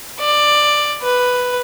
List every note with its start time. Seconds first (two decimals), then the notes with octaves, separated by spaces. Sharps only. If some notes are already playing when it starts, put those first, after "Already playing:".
0.20 D5
1.02 B4